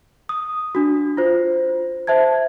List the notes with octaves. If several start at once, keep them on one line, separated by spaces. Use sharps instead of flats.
D#6
D4 F#4
F4 C5
C5 E5 A5 G#6